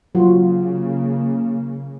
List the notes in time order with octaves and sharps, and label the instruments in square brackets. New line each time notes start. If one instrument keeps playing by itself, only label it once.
[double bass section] C#3 A#3 [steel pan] F#3 F4 F#4